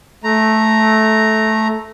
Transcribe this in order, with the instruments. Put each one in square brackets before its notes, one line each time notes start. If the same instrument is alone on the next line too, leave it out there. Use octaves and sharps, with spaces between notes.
[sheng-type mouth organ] A3 A#5